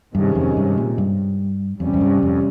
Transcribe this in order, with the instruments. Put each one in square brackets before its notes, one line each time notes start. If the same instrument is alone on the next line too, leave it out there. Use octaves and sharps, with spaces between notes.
[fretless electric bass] G2 [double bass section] C3 D#3 G#3 C#4
[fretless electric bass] F2
G2
A#2
G2
[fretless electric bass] F2 [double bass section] C3 G3 C#4
[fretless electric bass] F2
G2
F2